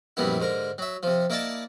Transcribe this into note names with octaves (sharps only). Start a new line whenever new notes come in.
A#1 F#2 G3 B3 E4
G#2 D3 A#4
F#3 E5
C3 F3
A#3 E4 D5 D#5 A5